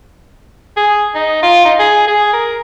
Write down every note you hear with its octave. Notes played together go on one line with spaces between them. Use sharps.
G#4
D#4
F4
D#4
G#4
G#4
A#4